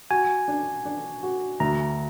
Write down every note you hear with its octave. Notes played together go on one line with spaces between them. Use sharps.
F#4 G#5
D4
D4
F#4
D2 A#5